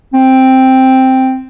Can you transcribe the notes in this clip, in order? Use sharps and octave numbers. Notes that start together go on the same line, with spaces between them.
C4